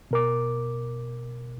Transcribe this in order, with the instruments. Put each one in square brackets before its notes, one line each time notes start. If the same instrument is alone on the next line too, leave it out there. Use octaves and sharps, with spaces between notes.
[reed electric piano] B2 A#4 D6